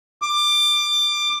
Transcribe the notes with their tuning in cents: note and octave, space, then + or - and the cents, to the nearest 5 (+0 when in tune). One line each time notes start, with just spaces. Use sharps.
D6 +20